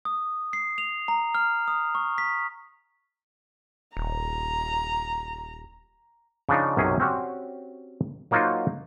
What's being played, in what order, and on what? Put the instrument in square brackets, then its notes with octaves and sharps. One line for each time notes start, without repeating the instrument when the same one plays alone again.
[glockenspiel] D#6
C7
F7
A#5
F6
D#6
C#6
B6
[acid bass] D#1 [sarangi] A#5
[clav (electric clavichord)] C#3 F3 D4 D#4
B1 F#2 C3 C#4 G#4
C4 C#4 F#4 G4 D5
F#3 A#3 D#4 F4 F#4 C5